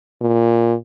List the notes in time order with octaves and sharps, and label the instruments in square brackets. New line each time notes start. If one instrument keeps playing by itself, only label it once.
[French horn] A#2